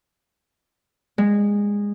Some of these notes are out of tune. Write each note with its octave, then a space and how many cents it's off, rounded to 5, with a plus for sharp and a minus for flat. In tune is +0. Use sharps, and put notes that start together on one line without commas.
G#3 -20